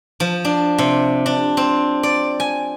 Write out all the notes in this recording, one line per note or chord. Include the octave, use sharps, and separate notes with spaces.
F3
D4
C3
D4
C4
D5
G#5